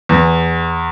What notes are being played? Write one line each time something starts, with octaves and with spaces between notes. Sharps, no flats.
E2